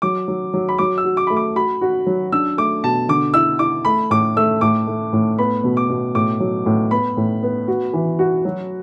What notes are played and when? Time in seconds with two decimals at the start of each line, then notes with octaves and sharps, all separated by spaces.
0.02 F#3 D6
0.28 F#3
0.54 F#3
0.69 B5
0.78 F#3 D6
0.98 E6
1.04 F#4
1.17 D6
1.27 A3 B5
1.37 D6
1.56 F#4 B5
1.81 F#4
2.06 F#3
2.32 D4 E6
2.58 A3 D6
2.84 B2 A5
3.09 D3 D6
3.34 E4 E6
3.59 E4 D6
3.85 A3 B5
4.11 A2 D6
4.37 A3 E6
4.61 A2 D6
4.87 A3
5.13 A2
5.38 B3 B5
5.64 B2
5.77 D6
5.89 B2
6.15 A2 D6
6.40 F#3
6.66 A2
6.91 B3 B5
7.17 A2
7.43 B3
7.68 F#4
7.93 E3
8.19 F#4
8.45 F#3